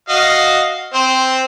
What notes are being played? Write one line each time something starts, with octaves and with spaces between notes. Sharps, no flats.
F#4 D#5 F5
C4 C5